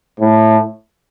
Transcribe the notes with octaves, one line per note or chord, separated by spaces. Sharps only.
A2